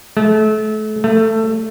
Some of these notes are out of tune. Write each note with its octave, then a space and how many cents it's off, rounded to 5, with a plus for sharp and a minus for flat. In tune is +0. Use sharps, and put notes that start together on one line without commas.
A3 -35
A3 +15